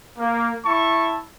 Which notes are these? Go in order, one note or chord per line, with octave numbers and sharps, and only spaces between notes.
A#3
E4 A5 C#6